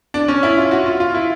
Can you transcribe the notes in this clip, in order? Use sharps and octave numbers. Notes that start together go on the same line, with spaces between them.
D4
C#4
E4
F4
F#4
F4
F4
E4